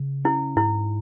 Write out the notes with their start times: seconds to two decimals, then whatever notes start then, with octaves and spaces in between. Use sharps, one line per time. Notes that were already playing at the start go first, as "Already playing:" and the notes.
Already playing: C#3
0.25 C#4 E4
0.56 G#2 E4